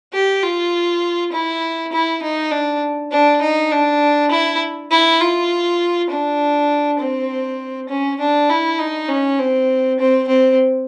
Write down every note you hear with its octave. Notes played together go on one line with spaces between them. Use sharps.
G4
F4
E4
E4
D#4
D4
D4
D#4
D4
E4
E4
F4
D4
C4
C#4
D4
E4
D#4
C#4
C4
C4
C4